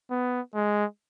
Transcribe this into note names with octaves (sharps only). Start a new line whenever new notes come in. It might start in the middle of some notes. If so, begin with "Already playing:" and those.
B3
G#3